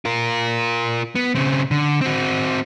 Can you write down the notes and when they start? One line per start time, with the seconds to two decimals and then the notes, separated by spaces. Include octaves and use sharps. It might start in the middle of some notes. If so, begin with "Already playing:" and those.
0.05 F4 A#4
1.15 B3
1.35 C#3 C4
1.71 D3
2.01 C4 F#4